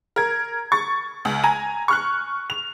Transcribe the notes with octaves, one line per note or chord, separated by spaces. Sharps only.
A#4 G#6
C#6 A6
C#2
G#5 A#5
C#6 F6 F#6
F7